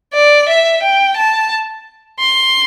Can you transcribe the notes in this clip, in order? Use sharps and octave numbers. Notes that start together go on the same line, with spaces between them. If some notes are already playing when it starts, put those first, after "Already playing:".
D5
E5
G5
A5
C6